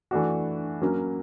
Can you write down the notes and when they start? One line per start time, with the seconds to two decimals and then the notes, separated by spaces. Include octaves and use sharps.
0.11 E3 A3 D4 F#4
0.82 F#3 A#3 C#4